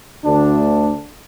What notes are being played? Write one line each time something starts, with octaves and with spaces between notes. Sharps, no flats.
D2 D4